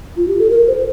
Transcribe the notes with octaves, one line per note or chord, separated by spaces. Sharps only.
F4
G4
A4
A#4
C5